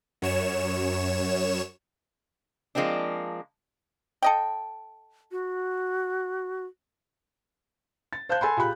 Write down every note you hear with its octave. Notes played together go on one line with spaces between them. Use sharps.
F#2 C#5 E7
F3 G#3 A#3 C4 D4
A4 D#5 G5
F#4
A6
C5 F5 A5 F#6 G6
A4 G#5 B5 C6
A#2 G4 G#4 B5 F#6